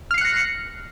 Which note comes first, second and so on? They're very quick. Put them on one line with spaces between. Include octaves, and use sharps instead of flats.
F6 C7 C#7 F#6 A#6